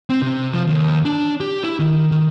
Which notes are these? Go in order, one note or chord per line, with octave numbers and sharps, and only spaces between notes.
C4
C3
F3
D#2
D4
G4
E4
D#3
D#3